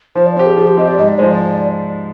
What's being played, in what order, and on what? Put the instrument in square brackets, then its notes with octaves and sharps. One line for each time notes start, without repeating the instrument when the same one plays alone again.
[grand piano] F3 [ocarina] C5
[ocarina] D5
[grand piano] C4 G4 [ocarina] C5
[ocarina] G#4
[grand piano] F3 [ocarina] G#4
[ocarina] G4
[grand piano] C4 [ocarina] D#5
[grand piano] G4
[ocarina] D5
[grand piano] G#2 [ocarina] D#5
[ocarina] D5
[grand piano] F3 G#3 [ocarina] C5
[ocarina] D5